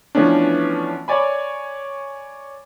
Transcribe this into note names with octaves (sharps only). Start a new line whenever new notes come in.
E3 F3 A3 B3 C#4 D4
C#5 D5 G#5 B5